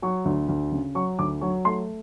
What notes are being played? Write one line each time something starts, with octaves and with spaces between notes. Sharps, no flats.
F#3 C#6
D2
D2
C#3
F#3 C#6
D2 D6
F#3 C#6
A3 C6